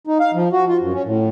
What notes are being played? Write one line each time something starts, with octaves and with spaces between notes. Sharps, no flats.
D#4
F5
F3
F#4
F4
F#2
C#4
A2